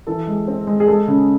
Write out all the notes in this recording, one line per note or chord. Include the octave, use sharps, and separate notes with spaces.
E3 A4
G#3
C4
G#3
G#4
G#3 A4
C#3